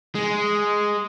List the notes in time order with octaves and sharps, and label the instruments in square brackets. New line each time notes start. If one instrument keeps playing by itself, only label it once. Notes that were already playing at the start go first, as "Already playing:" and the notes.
[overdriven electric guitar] G#3